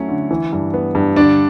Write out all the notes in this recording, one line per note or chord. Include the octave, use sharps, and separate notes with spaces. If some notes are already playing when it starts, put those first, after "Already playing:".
Already playing: F#3 A3 C#4 E4
D3
E3
G2
B3
G2
D3 D4 D5